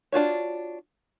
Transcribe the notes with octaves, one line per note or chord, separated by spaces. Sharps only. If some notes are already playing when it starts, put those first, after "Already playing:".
D4 F4 F#4 C#5